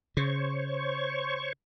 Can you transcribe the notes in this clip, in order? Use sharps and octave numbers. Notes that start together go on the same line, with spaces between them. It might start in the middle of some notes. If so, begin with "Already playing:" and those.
C#3 C5 C#5 C#6